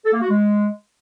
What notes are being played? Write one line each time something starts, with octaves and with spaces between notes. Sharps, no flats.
A4
A#3
F#4
G#3